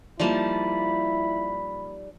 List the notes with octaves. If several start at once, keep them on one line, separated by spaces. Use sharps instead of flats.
F3 G3 A#3 D#4 E4 D5 A5 B5